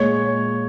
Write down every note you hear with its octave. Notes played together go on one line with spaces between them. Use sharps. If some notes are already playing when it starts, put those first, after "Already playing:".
Already playing: A#2 G#3 C#5